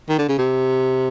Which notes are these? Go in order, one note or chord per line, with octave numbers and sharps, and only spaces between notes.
D#3
D3
C#3
C3